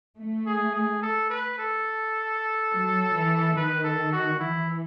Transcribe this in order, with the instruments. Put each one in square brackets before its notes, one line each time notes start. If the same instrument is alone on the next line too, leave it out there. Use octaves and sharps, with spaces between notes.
[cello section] A3
[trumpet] G#4
G#4
A4
B4
A4
[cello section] F#3
E3
[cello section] D#3 [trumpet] B4
[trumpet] A4
F#4
[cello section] E3 [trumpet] E4